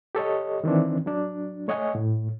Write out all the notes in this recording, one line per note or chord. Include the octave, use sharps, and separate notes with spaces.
G4 A4 C#5 D#5
D#3 E3 C4 D4
F#3 D4
A3 C#5 D#5 F#5 G#5
A2